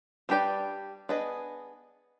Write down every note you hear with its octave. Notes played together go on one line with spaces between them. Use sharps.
G3 D4 G4 B4 D5
B3 D4 G#4 B4 D#5